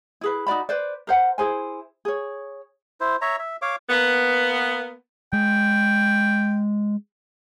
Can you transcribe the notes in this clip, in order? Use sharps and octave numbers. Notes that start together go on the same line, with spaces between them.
E4 G#4 B4
D#4 F#4 D5 B5
B4 C5 D5
A#4 C5 F#5
E4 G#4 C5 G#5
G#4 C#5
E4 C5
C#5 E5 A#5
E5
C#5 F5 D6
A#3 B3
G#3 G5